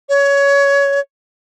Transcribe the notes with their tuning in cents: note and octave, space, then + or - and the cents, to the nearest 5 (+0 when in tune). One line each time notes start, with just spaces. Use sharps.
C#5 +20